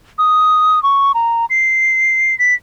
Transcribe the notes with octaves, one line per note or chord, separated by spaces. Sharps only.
D#6
C#6
A#5
C7
B6